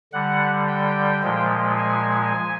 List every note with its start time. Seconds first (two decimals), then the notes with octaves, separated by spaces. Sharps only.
0.13 D3 G3 F#5
0.68 G5
1.23 A#2 F3 G#3
1.78 G#5